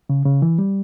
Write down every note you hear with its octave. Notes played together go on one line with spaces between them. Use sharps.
C#3
C#3
E3
G3